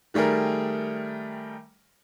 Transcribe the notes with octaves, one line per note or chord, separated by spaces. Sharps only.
D#3 G3 A3 G#4 A#4